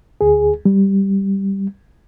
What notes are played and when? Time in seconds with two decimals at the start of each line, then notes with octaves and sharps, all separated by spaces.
0.21 D2 G#4
0.65 G3